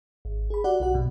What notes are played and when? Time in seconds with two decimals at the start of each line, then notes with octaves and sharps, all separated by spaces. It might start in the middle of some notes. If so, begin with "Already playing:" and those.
0.25 G#1
0.50 G#4 B5
0.64 F#4 G4 D5 F#5
0.80 B1 F#4 F#5
0.94 A#1 F#2 B2